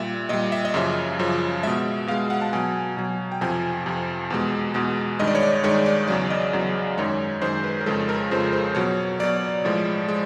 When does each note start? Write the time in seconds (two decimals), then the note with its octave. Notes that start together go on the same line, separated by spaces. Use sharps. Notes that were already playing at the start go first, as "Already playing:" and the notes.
Already playing: A#2 G3 E5
0.29 A#2 G3 D#5
0.52 E5
0.65 D#5
0.74 F#2 C#3 F3 E5
1.19 F#2 C#3 F3
1.63 B2 G#3 E5
2.07 B2 G#3 F5
2.30 F#5
2.42 A5
2.53 B2 F#3 G#5
2.97 B2 F#3
3.32 G5
3.41 F2 C3 F3 G#5
3.86 F2 C3 F3
4.30 E2 B2 G#3
4.74 E2 B2 G#3
5.19 G2 D#3 G#3 D#5
5.27 D5
5.35 C#5
5.43 D5
5.64 G2 D#3 G#3 C#5
5.86 D5
6.08 E2 C#3 F#3 D5
6.30 D#5
6.53 E2 C#3 F#3
6.97 F#2 D#3 G#3 C#5
7.42 F#2 D#3 G#3 C5
7.64 B4
7.81 A#4
7.86 F2 C#3 F3 G#3 A4
8.09 A#4
8.31 F2 C#3 F3 G#3 C5
8.53 C5
8.75 B2 F#3 C#5
9.20 B2 F#3 D5
9.65 A2 F3 G#3
10.09 G#3